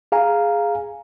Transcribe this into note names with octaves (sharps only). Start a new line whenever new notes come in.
G#4 F5 G#5 A#5